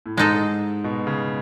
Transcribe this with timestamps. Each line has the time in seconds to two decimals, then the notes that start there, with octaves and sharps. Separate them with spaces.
0.06 A2
0.17 G#2 G#3 D#4 A4
0.84 B2
1.07 C#3